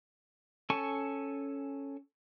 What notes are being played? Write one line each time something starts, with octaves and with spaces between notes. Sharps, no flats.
C#4 A4 G#5 A5 C#6